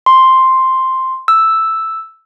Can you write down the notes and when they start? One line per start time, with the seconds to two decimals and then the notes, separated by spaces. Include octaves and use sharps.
0.06 C6
1.28 E6